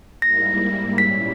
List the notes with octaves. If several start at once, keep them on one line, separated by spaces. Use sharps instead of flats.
G#2 G3 A#3 E4 A#6
A#2 G3 C#4 E4 B6